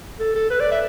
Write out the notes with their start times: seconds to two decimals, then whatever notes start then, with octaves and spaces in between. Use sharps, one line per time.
0.20 A4
0.35 A4
0.50 B4
0.60 D5
0.72 E5